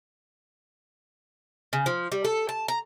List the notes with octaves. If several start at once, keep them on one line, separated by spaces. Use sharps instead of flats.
C#3
F3
G3
A4
A5
A#5